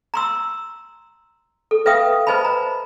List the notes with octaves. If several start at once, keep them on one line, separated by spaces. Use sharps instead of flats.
A#5 C6 E6
A4
B4 E5 F5 G5 D#6
B4 C5 D#5 G#5 A5 B5
A#5